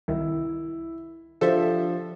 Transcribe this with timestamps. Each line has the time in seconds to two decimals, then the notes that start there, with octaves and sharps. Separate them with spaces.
0.08 C2 D#3 E4
1.41 F3 D4 G4 A4 C5 E5